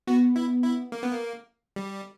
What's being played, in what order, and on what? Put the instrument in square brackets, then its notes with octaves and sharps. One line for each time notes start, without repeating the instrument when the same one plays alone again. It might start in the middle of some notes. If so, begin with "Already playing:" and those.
[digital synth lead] B3 [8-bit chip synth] F#4
[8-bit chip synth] E4
E4
A#3
B3
A#3
G3